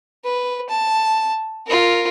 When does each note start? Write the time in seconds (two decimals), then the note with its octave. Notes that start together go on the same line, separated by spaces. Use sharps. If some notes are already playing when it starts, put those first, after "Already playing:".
0.25 B4
0.69 A5
1.67 F4 A#4